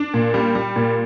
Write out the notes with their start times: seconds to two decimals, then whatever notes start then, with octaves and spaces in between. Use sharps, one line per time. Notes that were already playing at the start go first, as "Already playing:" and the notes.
Already playing: D4
0.14 A#2
0.34 G3
0.55 G3
0.76 A#2